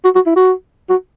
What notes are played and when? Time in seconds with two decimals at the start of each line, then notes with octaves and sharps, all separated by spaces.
0.05 F#4
0.15 F#4
0.26 E4
0.36 F#4
0.90 F#4